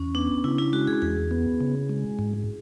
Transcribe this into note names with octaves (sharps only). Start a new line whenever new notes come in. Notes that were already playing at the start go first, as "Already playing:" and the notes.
Already playing: E2 C#4
B3 D4
C#3 E4
E4
G#3 F#4
G#4
E2 G#4
B3
C#3
G#3
G#2